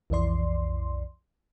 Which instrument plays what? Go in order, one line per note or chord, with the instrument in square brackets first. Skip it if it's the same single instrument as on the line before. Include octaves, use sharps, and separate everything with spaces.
[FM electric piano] B1 F2 E3 D5 C6